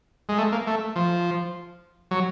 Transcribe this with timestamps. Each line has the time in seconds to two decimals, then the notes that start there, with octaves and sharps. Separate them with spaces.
0.29 G#3
0.38 A3
0.52 A#3
0.67 A3
0.96 F3
2.11 F#3